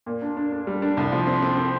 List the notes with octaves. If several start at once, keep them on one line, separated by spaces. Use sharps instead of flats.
A#2
D4
D4
D4
G3
D4
C2
F3
C4
C4
C4